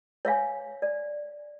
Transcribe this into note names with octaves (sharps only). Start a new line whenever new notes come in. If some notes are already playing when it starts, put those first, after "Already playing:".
C#5 E5 F5 G#5
D5